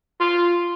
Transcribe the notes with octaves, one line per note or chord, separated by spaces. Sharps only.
F4